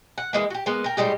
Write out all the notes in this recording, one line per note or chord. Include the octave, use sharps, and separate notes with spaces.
F#5
E3 G#3 A#3
F#4 G4
G#3 A#3 B3
A#4 G5
A2 G3 G#3 G4